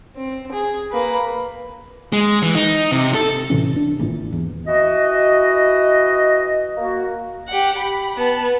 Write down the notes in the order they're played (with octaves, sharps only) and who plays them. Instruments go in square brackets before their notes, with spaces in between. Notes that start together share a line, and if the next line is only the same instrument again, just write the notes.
[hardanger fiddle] C4
G#4
A#3 B4
[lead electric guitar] G#3
E3
D#4
C3
A4
[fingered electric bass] A2 C3 E3 C#4
D4
G#1 A#2 E3
E2
[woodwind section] E3 F#4 D#5
A#3 F#4
[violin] G4 F#5
B5
B3 A5